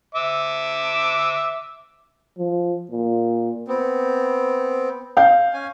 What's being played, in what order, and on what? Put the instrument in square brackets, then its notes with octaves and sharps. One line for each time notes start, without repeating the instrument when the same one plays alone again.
[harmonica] E5 D6
[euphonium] F3
A#2
[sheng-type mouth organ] B3 C4
[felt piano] F5 G6
[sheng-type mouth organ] C#4 G#5